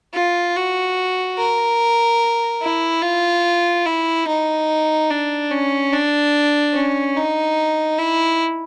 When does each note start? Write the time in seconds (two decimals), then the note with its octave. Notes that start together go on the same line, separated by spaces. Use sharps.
0.14 F4
0.56 F#4
1.37 A#4
2.62 E4
3.03 F4
3.85 E4
4.27 D#4
5.10 D4
5.51 C#4
5.93 D4
6.74 C#4
7.16 D#4
7.99 E4